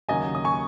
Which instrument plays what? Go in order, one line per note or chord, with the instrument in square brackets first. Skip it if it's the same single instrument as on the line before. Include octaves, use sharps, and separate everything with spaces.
[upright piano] D#2 C#3 F#3 A#3 D#5 G#5
D#6
G#5 C#6